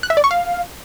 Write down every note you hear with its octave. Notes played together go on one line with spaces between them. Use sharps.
F#6
E5
D5
C#6
F5